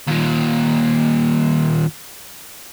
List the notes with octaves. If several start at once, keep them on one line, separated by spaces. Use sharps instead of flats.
D#2 A#2